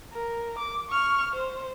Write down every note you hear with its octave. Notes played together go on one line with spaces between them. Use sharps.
A#4
D6
C#6 F6
C5